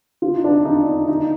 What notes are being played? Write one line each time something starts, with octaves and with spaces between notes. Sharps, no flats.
F4
D#4
D4
D#4
D#4